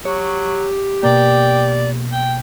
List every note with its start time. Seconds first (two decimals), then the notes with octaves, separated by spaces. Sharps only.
0.05 F#3 G4 C#5
1.03 B2 A#3 D5 G5
2.12 G5